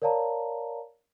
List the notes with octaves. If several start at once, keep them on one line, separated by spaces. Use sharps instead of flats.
A#4 C#5 D5 F5 A5 A#5